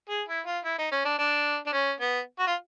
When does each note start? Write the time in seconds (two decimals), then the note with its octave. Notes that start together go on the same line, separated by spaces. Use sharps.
0.09 G#4
0.28 E4
0.46 F4
0.64 E4
0.79 D#4
0.92 C#4
1.05 D4
1.19 D4
1.67 D4
1.73 C#4
2.00 B3
2.39 F#4
2.47 F4